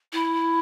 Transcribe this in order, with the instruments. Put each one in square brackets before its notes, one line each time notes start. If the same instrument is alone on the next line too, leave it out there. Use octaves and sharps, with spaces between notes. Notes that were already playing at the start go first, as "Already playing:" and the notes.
[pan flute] E4